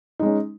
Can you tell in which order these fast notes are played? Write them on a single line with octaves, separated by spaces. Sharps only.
D#4 G#3 C#4